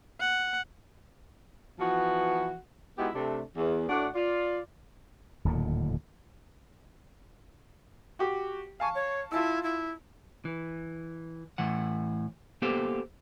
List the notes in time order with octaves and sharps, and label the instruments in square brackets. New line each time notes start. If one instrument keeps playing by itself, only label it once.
[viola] F#5
[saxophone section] E3 F3 B3 F#4
G#3 B3 D#4 E4 F#4 G4
C3 A3 D4
E2
A2 D4 F#4 D5 F#5
F4 D5
[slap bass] D1 D#2 A#2 D3
[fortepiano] F#4 G4 D6
[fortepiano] F5 A5 C#6 [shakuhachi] G#5
[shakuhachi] C#5
[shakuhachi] E4 [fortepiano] F4 A5 E6
[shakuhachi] E4
[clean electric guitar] E3
A2 E3 F#5
A#3 B3 G4 A4 C5 F5